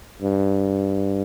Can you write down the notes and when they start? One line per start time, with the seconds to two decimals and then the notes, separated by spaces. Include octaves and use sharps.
0.22 G2